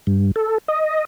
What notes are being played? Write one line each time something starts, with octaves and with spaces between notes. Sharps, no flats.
G2
A4
D#5